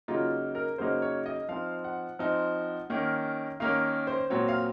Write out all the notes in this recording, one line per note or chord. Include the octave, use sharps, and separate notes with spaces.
C#3 F#3 A#3 D#4 F4
A#4
C#3 F#3 A#3 D#4 C5
C#5
D#5
F3 C4 D#4 F5
F#5
F3 C4 D#4
D#3 A#3 C#4
D#3 A#3 C#4 F5
C5
A#2 F#3 C4 C#5
F5